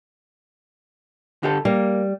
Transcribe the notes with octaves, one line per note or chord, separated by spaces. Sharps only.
D3 G4 A4
G3 A#3